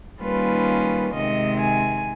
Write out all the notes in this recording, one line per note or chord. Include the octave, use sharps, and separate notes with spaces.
D#3 G3 A#3 C#4 F4 B4
C3 D#3 G#3 D#5
G#5